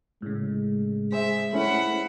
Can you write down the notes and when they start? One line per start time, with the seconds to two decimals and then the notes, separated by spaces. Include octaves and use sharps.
0.22 A2 C#3 G#3
1.12 G#4 C5 E5
1.53 A3 C#4 E4 F#5 B5